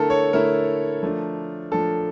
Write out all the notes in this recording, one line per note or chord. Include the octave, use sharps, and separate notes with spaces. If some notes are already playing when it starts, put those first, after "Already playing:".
Already playing: D3 A3 E4 A4 A#4
C#5
D3 A3 E4 A#4
F3 A3 D4
F3 A3 D4 A4